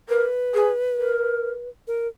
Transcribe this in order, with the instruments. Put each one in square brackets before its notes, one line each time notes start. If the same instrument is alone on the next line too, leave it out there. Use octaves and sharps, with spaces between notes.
[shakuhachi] A#4 [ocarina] B4
[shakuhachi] G#4
A#4
[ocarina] A#4